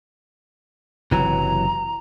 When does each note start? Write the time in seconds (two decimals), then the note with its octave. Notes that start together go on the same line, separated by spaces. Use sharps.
1.11 F#1 C3 E3 F#3 A#5